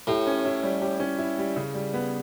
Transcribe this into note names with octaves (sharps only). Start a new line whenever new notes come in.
A2 G4
C#4
E4
G3
G4
C#4
E4
G3
C#3
G3
B3